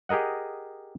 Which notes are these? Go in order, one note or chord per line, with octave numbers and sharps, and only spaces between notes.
G4 G#4 A#4 D#5 F#5